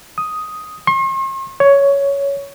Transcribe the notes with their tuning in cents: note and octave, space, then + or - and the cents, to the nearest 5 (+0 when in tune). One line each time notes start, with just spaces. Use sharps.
D#6 +5
C6 +45
C#5 +10